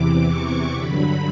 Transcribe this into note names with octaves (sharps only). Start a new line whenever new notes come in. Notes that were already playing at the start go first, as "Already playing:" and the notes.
Already playing: E2 C3 E3 D6
C#6
G2 D3 F#3 B5